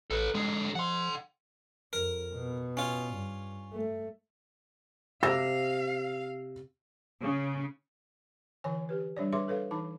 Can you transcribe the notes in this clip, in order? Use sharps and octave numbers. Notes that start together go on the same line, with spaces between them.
A1 A4 B4
D3 G#3 G#4
F3 F#5 C6
F2 A#4
B2
C#4 F4
G2
A3
C3 F5 E6 A#6 E7
C#3
D3 E3 C#5 G#5
G4 B4
G3 D4 C#5 D5
G#4 B4 C#5 E5 C6 D6
G#4 A4 B4 C#5 F5
E3 D#4 A5 D6